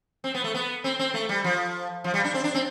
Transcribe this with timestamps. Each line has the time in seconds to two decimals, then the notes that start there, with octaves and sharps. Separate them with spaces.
0.24 C4
0.35 B3
0.44 A3
0.54 B3
0.84 C4
0.99 C4
1.14 A3
1.29 G3
1.44 F3
2.04 F3
2.14 G3
2.24 D4
2.34 C4
2.44 D4
2.54 C4